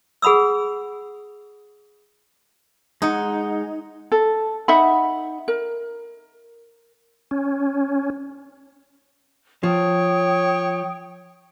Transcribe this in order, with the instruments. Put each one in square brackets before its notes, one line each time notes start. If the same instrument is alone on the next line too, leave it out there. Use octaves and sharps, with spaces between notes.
[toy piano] G#4 F#5 B5 D#6 E6
[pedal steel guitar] G#3 F#5 [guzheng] D#4
[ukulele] A4
D#4 E5 F#5 B5
A#4
[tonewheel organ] C#4
[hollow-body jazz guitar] F3 [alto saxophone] C#5 [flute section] G5 D#6